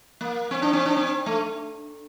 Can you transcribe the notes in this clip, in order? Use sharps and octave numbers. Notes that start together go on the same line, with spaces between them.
A#3
C4
D4
C4
D4
C4
A3